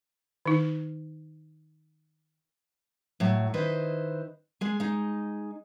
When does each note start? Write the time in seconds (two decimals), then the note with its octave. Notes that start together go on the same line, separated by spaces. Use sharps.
0.46 D#3 D#4
3.20 A2 F#3
3.54 D#3 E4 B4 C5 D#5
4.61 G#3 G#4
4.80 G#3 D#4